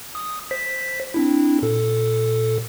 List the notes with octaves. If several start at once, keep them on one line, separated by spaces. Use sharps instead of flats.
D#6
C5 B6
C4 D4 E4
A#2 A4